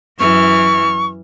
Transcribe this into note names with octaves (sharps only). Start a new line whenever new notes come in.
F#2 E3 C#6 F6